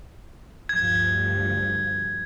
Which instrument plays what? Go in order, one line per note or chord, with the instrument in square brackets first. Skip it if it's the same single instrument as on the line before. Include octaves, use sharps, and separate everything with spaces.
[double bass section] D2 G2 F3 [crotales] G#6